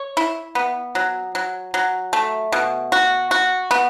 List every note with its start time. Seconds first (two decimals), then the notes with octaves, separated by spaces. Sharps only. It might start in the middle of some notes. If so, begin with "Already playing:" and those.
Already playing: C#5
0.17 E4
0.55 B3
0.95 F#3
1.35 F#3
1.74 F#3
2.13 A3
2.52 B2
2.92 F#4
3.31 F#4
3.71 B3